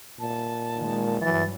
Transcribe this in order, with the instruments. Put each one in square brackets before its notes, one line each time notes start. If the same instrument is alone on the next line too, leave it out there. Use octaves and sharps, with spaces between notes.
[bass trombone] A#2 [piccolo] A5
[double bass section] D#3 G#3
[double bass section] G2 F#3 [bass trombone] E3 [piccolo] A6